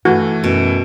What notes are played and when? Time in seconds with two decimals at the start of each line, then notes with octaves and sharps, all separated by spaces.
0.05 G2 E3 A3 F#4
0.44 F#2 B2